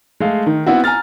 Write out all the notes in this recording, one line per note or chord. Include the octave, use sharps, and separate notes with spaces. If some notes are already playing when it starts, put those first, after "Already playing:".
G#3 A3 F5
D#3
B3 C4 E4 F#4
G#5 A#5 F6 A6